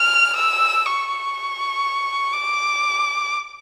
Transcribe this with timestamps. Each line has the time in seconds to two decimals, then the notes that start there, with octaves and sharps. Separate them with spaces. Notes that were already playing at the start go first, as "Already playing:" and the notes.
Already playing: F6
0.35 E6
0.86 C#6
2.34 D6